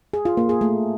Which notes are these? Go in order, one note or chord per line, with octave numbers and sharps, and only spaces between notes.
G#4
F4
A#3
G#4
A3